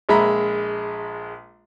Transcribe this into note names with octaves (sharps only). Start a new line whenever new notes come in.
A#1 G#3 E5 A#5 B5